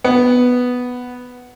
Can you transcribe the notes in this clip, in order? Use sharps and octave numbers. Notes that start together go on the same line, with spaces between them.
B3